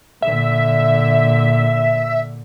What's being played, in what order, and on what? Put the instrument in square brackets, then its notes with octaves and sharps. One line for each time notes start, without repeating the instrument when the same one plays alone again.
[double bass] A#2 D3 [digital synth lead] E5